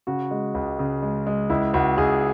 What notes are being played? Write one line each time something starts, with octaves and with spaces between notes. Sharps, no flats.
C#3 F#4
G#3
C#2
C#3
G#3
G#3
C#2 E4
C#2 F#4
C#2 G#4